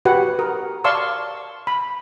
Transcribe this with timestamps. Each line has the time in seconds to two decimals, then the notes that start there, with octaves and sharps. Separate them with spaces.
0.05 F#4 G4 B4 F#5
0.39 A#4
0.84 D5 F5 A5 C6 C#6 E6
1.67 B5